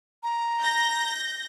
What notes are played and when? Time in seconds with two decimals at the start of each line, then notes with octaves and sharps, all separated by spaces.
0.23 A#5
0.61 G6 A#6